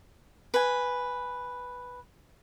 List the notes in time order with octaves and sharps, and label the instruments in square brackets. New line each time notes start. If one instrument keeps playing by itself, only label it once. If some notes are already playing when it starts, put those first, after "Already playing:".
[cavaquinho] B4 G#5